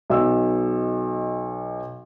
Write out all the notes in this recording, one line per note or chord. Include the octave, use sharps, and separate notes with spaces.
B1 D#5 E6